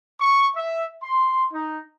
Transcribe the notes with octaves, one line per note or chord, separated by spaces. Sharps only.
C#6
E5
C6
D#4